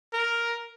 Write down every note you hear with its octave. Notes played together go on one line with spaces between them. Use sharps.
A#4